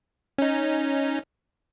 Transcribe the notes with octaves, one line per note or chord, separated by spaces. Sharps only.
C#4 D#4